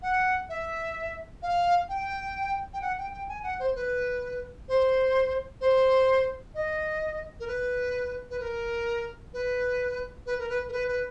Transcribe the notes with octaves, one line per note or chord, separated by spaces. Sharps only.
F#5
E5
F5
G5
G5
F#5
G5
G5
G#5
F#5
C5
B4
C5
C5
D#5
A#4
B4
B4
A#4
B4
B4
A#4
B4
A#4
B4
B4